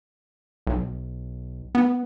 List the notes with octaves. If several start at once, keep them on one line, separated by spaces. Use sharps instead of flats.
B1
B3